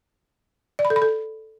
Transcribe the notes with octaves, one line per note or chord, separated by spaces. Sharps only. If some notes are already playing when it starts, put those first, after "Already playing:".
D5
B5
A4
B5
A4